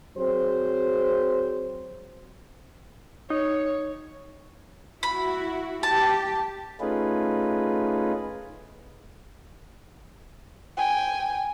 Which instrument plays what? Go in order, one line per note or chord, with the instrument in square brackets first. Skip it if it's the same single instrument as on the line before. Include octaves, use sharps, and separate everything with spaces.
[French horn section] F#3 C4 G#4 C5
[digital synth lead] D#4 [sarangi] C#5
[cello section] E4 F#4 [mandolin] B5
[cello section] G4 [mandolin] A5
[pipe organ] A3 C#4 D#4 F4 G#4 B4
[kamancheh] G5 G#5